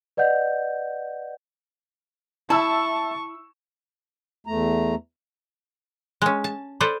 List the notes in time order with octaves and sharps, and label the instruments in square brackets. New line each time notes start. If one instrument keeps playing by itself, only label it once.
[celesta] B4 D5 D#5 F#5 G6
[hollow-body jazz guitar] E4 [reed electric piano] E5 [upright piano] A5 E6 [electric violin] C#6
[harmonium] E2 A3 A#5
[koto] G#3 C#4
A5
A4 B4 C5 D5